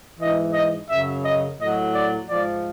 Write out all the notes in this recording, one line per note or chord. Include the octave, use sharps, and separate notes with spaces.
G#2 E3 D#5
D#5
F#2 C#3 F#3 E5
D#5
A2 F#3 D#5
D5
G#2 F3 D5